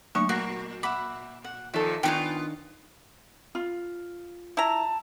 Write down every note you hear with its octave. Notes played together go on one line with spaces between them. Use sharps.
D3 F#3 A3 A#3 C#6
A#2 F#4 A#4
E5 F#5 B5 D6
F#5
A#2 D#3 F3 A4 E5
D#3 B3 D4 F4 C#5 G5 G#5 A#5
F4
E4 A5 A#5